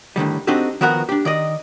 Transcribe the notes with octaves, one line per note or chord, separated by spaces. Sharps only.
A2 D3 D#3 G3
C4 D4 D#4 F#4 G4 A4
D#3 F3 B3 F#4 A#4 F#5
D4 G4
D#3 D5 D#5